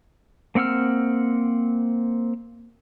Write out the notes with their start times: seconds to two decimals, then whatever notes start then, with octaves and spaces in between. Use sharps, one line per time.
0.55 A#3 C4 F#5 E6 F6